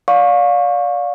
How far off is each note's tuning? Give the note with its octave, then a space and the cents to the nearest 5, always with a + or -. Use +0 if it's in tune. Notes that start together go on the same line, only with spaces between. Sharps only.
D5 -25 F5 +30 C#6 -10